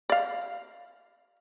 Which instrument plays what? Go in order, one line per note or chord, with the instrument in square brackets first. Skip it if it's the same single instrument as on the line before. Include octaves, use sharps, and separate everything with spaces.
[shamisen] D5 F5